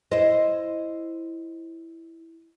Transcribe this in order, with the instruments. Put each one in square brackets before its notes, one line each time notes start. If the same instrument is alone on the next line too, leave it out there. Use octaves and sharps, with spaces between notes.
[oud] E4 C5 [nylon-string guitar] D#5